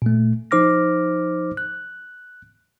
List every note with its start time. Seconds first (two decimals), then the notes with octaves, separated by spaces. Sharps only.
0.02 A#2 A3
0.51 F3 D#4 C5 D6 F6 A#6
1.57 F#6